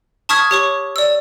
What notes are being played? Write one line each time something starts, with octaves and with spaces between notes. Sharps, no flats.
A5 C#6 D#6 F6 G#6 B6
G4 C#5 C#6
D5 E6